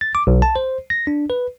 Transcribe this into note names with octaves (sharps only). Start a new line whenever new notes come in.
A6
D6
B1
A5
C5
A#6
D4
B4